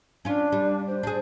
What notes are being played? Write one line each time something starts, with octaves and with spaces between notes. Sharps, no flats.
C#4 D4 F4
G3
C5
D4 G#4